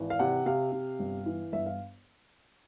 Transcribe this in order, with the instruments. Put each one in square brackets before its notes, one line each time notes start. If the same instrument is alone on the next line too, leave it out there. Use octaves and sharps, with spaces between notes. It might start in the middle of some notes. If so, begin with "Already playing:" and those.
Already playing: [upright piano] G#1 E3
F5
C3 F#5
C3 F5
C3
G1
E3
G1 E5
F5